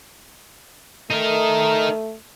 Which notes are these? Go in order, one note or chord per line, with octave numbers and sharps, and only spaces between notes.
A3 D#4 A#4